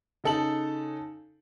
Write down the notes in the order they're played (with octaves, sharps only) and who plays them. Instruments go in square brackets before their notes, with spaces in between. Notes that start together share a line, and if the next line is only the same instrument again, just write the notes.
[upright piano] C#3 D#4 A4 A5 F#7